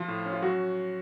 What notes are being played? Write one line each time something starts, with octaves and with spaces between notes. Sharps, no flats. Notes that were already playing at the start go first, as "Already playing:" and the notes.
Already playing: F3 F4
A2
C#4
F4
F#3 F#4